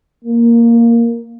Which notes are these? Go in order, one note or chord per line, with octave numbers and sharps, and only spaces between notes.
A#3